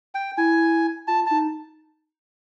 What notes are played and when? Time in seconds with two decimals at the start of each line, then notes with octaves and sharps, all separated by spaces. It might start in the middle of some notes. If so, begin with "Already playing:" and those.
0.15 G5
0.37 E4 G#5
1.08 F4 A5
1.26 D#4 A5